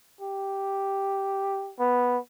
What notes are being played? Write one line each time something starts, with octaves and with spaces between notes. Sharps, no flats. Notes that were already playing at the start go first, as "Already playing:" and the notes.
G4
B3